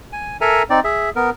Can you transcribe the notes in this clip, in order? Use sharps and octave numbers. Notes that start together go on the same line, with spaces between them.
G#5
A4 A#4 E5 G#5 A#5
C4 D#4 D5
G#4 E5
B3 A#4